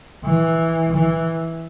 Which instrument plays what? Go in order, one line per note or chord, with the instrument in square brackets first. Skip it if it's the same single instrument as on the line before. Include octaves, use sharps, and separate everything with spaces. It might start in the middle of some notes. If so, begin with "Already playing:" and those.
[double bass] E3
E3